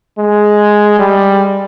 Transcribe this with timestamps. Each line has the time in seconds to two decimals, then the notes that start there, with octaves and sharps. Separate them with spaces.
0.18 G#3
0.99 G3